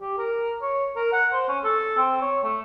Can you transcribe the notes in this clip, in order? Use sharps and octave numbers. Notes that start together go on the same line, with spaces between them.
G4
A#4
C#5
A#4
F#5
C5
C#4
A4
C4
C#5
A3